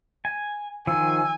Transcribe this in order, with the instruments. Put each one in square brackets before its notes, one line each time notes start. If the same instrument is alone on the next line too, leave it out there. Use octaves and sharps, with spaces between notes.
[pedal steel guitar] G#5
[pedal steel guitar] D#3 F3 [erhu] G#5 [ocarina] E6